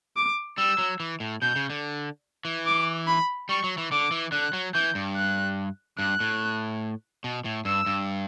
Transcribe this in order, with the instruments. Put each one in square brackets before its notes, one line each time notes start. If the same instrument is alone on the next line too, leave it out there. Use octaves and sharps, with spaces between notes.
[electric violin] D6
[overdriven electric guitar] G3 [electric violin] E6
[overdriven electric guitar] F#3
E3
A2
[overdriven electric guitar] B2 [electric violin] G6
[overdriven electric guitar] C#3
D3
E3
[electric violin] D6
B5
[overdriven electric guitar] G3 [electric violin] C#6
[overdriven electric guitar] F#3
E3
[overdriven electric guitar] D3 [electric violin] D6
[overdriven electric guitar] E3
[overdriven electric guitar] D3 [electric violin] F#6
[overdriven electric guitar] F#3
[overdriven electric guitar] E3 [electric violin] G6
[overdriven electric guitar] G2
[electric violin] F#6
[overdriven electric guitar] G2 [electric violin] F#6
[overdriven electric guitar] A2
B2
A2
[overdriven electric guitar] G2 [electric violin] E6
[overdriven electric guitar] G2